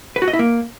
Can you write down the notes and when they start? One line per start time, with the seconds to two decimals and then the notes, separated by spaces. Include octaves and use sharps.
0.16 B4
0.22 F#4
0.28 D#5
0.33 E4
0.39 A#3